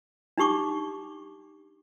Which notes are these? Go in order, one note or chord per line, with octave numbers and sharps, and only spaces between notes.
D4 D#4 G4 C#6 D6